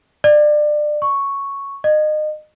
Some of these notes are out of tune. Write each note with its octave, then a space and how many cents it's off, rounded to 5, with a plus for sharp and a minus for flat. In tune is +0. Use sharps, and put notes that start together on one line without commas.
D5 +25
C#6 +0
D#5 -30